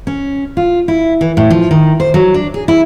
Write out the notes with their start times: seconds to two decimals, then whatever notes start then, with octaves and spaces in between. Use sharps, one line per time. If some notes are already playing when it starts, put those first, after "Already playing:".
0.07 C#4
0.57 F4
0.88 E4
1.21 E3
1.37 A2
1.50 F3
1.71 D#3
2.00 C5
2.14 F#3
2.34 D4
2.54 G#4
2.68 E4